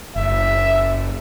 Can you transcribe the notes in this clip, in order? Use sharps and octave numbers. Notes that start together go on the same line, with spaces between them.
F#1 E5